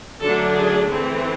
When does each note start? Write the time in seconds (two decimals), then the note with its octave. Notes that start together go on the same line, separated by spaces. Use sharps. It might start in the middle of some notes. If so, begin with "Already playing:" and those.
0.21 D3 F#3 A3 D4 A4
0.55 G#4
0.89 E3 A3 C4